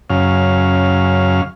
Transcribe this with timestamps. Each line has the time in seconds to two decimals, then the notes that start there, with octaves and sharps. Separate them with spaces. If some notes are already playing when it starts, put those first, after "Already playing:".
0.10 F#2 C#3 F5